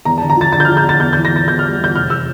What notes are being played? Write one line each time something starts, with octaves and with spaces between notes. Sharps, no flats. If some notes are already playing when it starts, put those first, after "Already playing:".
E2 A#5
A5
D3
A#5
F3 A6
D3 A6
G6
F6
F3
G6
D3 A6
E2 G6
G6
E3
A#6
E2 A6
E2 G6
F6
G3
E2 G6
F1 F6
E3 E6